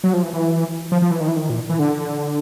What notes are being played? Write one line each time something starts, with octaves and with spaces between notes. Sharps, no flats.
F#3
F3
E3
E3
F3
F3
E3
D#3
E3
D#3
A#2
E3
D3